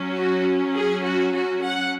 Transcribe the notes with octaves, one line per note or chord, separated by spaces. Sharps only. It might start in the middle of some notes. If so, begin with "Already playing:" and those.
Already playing: F#3 C#4
F#4
G#4
F#4
F#4
F#5